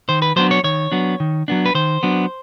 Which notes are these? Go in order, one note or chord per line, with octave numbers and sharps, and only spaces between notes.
D#3 C5
B4
F#3 B3 D4 C5
C#5
D#3 C#5
F#3 B3 D4
D#3
F#3 B3 D4
B4
D#3 C5
F#3 B3 D4